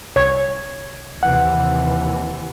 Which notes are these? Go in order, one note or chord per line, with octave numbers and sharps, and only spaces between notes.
C2 C#5 G#6
D#2 C3 E3 F#5